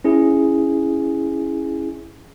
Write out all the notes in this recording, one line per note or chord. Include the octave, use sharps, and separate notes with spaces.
C#4 E4 G#4